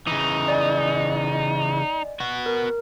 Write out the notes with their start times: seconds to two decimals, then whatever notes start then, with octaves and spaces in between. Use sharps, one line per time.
0.07 C#3 E3 D#4
0.48 D5 D#5 G#5
2.20 B3 F#4
2.46 A#4